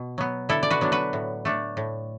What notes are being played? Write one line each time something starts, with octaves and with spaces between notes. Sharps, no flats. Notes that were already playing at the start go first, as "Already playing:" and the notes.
Already playing: B2
F#3 B3
D3 E4 A4
D5
F#4 B4
F#3 B3 D4
F#4 B4
A2
A3 D4
A2